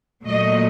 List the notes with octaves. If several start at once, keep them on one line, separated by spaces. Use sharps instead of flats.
A#2 F#3 A3 D#5